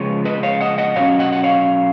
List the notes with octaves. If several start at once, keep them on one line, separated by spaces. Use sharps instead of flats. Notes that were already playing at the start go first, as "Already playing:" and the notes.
Already playing: C#3 F3 G#3 B3 C#5
B4 D#5
C#5 F5
D#5 F#5
D#5 F#5
B2 F#3 C#4 C#5 F5
D#5 F#5
F#5
C#5 F5